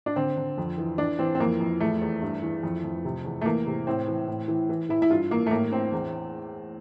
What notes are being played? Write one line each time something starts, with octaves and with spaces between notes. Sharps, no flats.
D4
D3 C4
D3
F2
E3
E3 D4
E3 C4
C4
F2 A#3
F2
E2 A3
E2
G2
E3
F2
F2
C3
E2
A3
E3 A#3
C3
A2 C4
E3
A2
E3
E3
E3 E4
E4
G2 F4
E3 A#3
A3
A2 A#3
A2 C4
E2